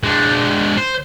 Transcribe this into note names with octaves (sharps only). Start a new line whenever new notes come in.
G#3 D4
C5